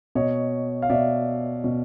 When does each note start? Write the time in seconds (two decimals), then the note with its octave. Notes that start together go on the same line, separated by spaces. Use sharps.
0.15 B2 C#5 D#5
0.82 F5
0.90 B2 D5 E5
1.64 B2